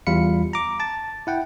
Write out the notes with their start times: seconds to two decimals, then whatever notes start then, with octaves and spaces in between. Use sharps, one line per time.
0.07 E2 G3 F4 F5 B5 C#7
0.53 A#5 D6
0.80 A5 A6
1.27 E4 F#5 G5